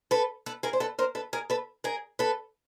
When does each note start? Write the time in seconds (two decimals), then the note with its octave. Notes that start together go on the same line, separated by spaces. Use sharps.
0.11 A4 B4
0.46 A4 B4
0.63 G#4 A#4
0.73 C5
0.80 A4 B4
0.99 A#4 C5
1.15 A4 B4
1.33 G#4 A#4
1.50 A4 B4
1.84 G#4 A#4
2.19 A4 B4